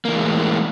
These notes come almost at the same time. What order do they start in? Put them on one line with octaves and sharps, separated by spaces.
A#3 D#3 E3 G#3 A2